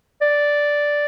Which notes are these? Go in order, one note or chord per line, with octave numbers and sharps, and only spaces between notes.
D5